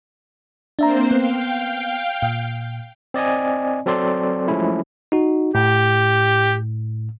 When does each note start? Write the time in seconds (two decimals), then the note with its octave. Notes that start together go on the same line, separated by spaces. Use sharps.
0.79 A#3 C4 D4 C5 E5 A#5
1.11 B3 F5 G5
2.23 A#2
3.14 C4 D5 D#5 G#5
3.86 F#3 C4 A4 D5 C6
4.48 F3 F#3 G#3 A3 C#4 E4
5.12 D#4 F#4
5.55 A2 G4